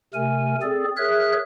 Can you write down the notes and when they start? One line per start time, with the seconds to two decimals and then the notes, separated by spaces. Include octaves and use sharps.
0.14 C3 A3 A#4 G#5
0.62 C4 G#4 A4 D5
0.97 G#4 A#4 C#5 E5 F#6